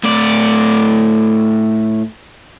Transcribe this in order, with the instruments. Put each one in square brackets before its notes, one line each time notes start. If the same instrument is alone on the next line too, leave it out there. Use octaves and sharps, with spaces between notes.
[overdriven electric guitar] A2 D5